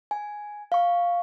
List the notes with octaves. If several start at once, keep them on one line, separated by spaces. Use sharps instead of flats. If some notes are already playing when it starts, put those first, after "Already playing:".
G#5
F5 C#6